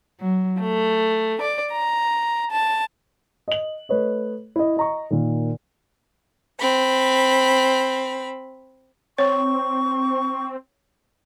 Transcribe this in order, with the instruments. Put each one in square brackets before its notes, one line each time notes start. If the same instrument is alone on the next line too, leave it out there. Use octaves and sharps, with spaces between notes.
[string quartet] F#3
A3
D5
A#5
A5
[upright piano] D#5 F#7
A3 B4 C#5 D#5
E4 D#5
D#5 A#5 C#6
A#2 D#3
[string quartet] C4 B5
[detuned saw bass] C4 [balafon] C#5 [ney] C#6